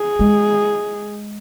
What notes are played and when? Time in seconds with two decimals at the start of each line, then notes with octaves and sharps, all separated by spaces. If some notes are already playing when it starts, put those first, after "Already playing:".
Already playing: G#4
0.19 G#3